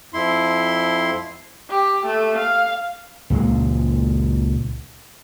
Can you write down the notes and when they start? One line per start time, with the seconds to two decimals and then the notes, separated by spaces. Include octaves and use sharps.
0.14 F2 E4 C6
1.70 G4
2.06 A3
2.38 F5
3.30 C#2 A#2 G#3